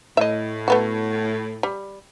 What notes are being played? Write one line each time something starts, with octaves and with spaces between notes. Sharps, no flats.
A2 D#5 E5
A3 B3 F#4
G3